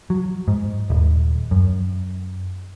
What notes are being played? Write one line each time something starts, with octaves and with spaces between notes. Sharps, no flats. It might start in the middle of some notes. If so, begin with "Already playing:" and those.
F#3
G#2
D#1
F#2